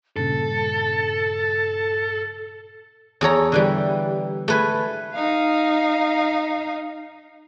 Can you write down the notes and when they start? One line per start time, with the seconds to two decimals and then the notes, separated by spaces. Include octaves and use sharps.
0.17 G2 A#2 C#3 A4 A6
3.21 E2 A4 C#5 A#5
3.52 D3 E3 G3
4.48 A3 B4 G#5
5.14 D#4 F5